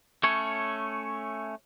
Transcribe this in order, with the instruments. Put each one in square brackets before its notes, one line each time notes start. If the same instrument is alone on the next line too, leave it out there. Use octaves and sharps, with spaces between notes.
[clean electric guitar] A3 C#4 C#5